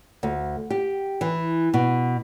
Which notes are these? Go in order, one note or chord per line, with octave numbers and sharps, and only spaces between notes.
D2
G4
E3
B2